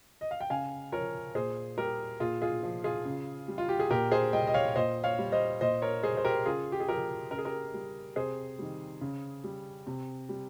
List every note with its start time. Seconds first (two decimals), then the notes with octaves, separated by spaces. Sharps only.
0.21 D#5
0.31 F5
0.40 G5
0.50 C#3 F5 G#5
0.92 F3 A#4 C#5
1.35 A#2 G#4 C5
1.77 G3 G4 A#4
2.20 A#2 F4 G#4
2.42 F4 G#4
2.63 F3
2.84 F4 G#4
3.05 C#3
3.48 G3
3.58 F4
3.69 G4
3.80 G#4
3.90 A#2 G4 A#4
4.12 G#4 C5
4.33 G3 D#5 G5
4.47 D#5
4.54 C#5 F5
4.76 A#2 C5 D#5
5.04 C#5 F5
5.19 G3
5.32 C5 D#5
5.61 A#2 C5 D#5
5.82 A#4 C#5
6.03 G3 G#4 C5
6.17 C5
6.25 G4 A#4
6.46 C#3 F4 G#4
6.72 G4
6.80 G#4
6.89 F3 G4 A#4
7.31 C#3 A#4
7.38 G#4
7.45 G4 A#4
7.74 G3
8.16 C3 G#4 C5
8.59 D#3 G3
9.01 C#3
9.44 G3
9.87 C3
10.29 G3